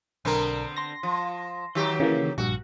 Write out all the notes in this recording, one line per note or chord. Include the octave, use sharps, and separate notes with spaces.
B1 D3 B3 C4 A#4
C6 A#6
F3
D#3 F#3 G4
C#3 E3 A#3
A#1 G2 F#4